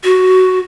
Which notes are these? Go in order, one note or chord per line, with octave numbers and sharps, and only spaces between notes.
F#4